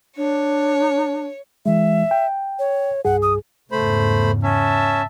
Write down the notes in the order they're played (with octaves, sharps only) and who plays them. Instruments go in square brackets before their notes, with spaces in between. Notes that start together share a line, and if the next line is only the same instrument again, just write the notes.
[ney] D4 [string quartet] C#5
[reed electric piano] E3 G#3 [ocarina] E5
[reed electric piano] G5
[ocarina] C#5
[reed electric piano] C2 G2 G#4 [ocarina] F#5
[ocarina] D#6
[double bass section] E2 G#2 C#3 [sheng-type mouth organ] A3 C5 B5
[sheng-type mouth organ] C#4 [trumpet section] E5 A5